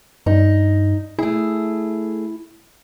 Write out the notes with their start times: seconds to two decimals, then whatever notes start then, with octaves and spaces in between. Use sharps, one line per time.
0.26 G2 D#4
1.19 A3 E4 G#4